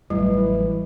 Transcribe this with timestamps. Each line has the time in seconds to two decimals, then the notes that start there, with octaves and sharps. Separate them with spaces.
0.10 A1 A2 E3 F#3 G3